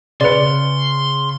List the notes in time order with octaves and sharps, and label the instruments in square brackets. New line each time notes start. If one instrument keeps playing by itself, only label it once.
[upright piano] C#3 C#7 [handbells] B4 D5 [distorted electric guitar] C6